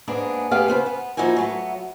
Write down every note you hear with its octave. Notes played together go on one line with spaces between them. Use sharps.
G#2 A#3 B3 D4 G#4
A3 B3 G4 G#4 F5
C#3 B3 C5
B3
F3 A#3 D#4 E4 F#4 G#5
F#3 A3 B3